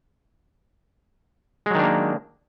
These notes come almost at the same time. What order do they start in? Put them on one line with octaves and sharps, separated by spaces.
G#3 F#3 D#3 D4 A#3